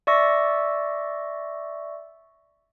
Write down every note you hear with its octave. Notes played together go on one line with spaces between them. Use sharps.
D5 E5 C#6 E6 A#6